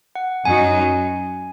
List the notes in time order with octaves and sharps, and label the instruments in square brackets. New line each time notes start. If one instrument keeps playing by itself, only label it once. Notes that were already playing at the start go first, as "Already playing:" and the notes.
[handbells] F#5
[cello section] F#2 F#3 D#4 F#4 [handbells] G#5